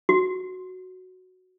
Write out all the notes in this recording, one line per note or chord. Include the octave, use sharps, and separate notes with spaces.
F#4